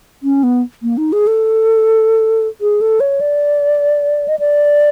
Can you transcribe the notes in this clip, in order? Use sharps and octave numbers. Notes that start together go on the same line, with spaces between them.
C#4
B3
A#3
D#4
G#4
A4
G#4
A4
C#5
D5
D#5
D5